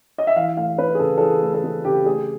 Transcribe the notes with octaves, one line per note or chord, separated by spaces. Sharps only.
D#5
E5
E3 F5
A3 F5
C4 B4
G#4
C#3 A4
A4
E3 G#4
A3 A4
A4
C4 G#4
C#3 G4
A3 G#4